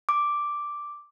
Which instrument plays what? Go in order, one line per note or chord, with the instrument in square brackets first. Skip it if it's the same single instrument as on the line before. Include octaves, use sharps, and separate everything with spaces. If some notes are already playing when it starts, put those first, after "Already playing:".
[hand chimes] D6